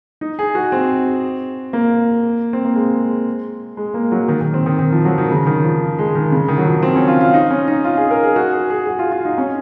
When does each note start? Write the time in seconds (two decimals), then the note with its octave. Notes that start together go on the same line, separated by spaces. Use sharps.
0.21 D#4
0.39 G#4
0.55 F#4
0.72 C4
1.73 A#3
2.53 C4
2.65 A#3
2.75 G#3
3.77 G#3
3.94 A#3
4.12 F#3
4.28 D#3
4.41 D#3
4.54 C4
4.66 D#3
4.79 D#3
4.92 F3
5.05 F#3
5.18 D#3
5.30 C#3
5.46 D#3
5.64 F3
5.98 G#3
6.15 D#3
6.32 C#3
6.48 D#3
6.58 F#3
6.65 F3
6.83 C4
6.96 C#4
7.08 F4
7.21 F4
7.34 D#4
7.51 C#4
7.68 D#4
7.85 F4
7.97 G#4
8.11 A#4
8.23 G#4
8.36 F#4
8.53 G#4
8.70 G#4
8.87 F#4
8.99 F4
9.12 F4
9.25 D#4
9.38 C#4